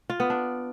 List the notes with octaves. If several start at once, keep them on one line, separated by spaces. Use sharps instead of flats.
F4
B3
D4